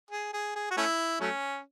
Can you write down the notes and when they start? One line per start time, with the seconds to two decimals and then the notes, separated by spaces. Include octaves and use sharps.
0.11 G#4
0.33 G#4
0.55 G#4
0.71 F#4
0.77 A3 C#4 E4
1.21 F#3 A3 C#4